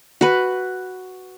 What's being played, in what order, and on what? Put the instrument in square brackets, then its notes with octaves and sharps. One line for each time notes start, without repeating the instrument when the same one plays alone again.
[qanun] F#4 B4